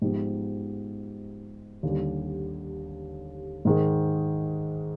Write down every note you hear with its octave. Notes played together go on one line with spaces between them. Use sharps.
G#2 F3 B3 D#4 G4
D#2 D3 G3
G#2 D#3 G#3